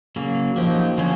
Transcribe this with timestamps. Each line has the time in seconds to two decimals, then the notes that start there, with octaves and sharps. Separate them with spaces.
0.16 C#3 F#3 A#3
0.56 F3 F#3 A#3 D#4 G4
0.98 D3 F3 A#3 C#4 F#4